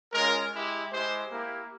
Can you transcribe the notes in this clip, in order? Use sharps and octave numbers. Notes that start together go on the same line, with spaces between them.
G#3 C#4 F4 A#4
G#3 E4 G4
G#3 E4 G4 C5
A#3 E4 G4